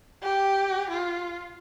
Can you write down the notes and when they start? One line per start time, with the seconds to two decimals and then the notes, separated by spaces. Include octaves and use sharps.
0.22 G4
0.89 F4